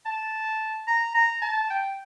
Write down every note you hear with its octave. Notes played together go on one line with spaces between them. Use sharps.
A5
A#5
A#5
A5
G5